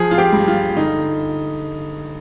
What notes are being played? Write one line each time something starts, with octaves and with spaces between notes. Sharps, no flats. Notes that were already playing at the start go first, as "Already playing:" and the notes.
Already playing: F3 G#4
F4
G4
G2
F4
D3 D#4